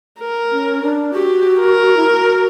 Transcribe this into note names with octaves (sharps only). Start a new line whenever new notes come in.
A#4
C#4
D4
F#4 G4
A#4
E4
F#4